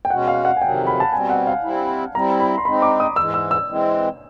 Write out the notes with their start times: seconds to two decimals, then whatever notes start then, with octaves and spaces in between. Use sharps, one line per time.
0.05 G5
0.10 B2 G#3 C#4 F#4 F#5
0.28 F5
0.45 F#5
0.57 G#5
0.61 F2 C3 D#3 F#3 G5
0.87 B5
1.00 A5
1.12 B2 G3 C4 G#5
1.30 F#5
1.47 F5
1.63 G3 C4 E4
2.15 G3 C4 E4 A#5
2.40 B5
2.58 C6
2.65 G#3 C4 D#4 B5
2.82 D6
3.00 D#6
3.16 G#2 E3 G#3 E6
3.34 E6
3.51 E6
3.68 E3 G#3 C4